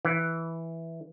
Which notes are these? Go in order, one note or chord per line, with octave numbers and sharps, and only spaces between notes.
E3